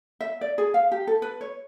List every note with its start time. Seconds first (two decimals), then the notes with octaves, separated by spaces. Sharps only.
0.20 E5
0.41 D5
0.58 G#4
0.74 F5
0.92 G4
1.07 A4
1.22 B4
1.41 C#5